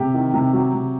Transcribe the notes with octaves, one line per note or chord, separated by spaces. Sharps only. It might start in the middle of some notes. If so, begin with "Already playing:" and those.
Already playing: C3 G4
D#3
C3
F#3
C3